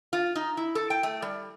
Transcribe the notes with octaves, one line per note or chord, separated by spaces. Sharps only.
F4
D#4
E4
A4
G5
A3
G3